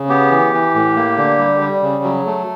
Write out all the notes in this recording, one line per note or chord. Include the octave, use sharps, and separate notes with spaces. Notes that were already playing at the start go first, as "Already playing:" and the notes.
Already playing: C#3
B3 G4
E3
E3
A2
A#3
D3
G3
G3
C#3
F#3
A3